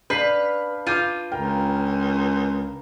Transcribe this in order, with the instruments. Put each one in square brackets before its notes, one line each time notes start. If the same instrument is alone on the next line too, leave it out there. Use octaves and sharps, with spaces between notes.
[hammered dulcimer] D4 F5 [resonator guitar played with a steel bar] B4 [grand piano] G6 B6 C7
[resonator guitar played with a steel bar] F4 [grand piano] D6 G6 D#7
[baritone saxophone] C#2 [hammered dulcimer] A#4 B4 [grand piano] G5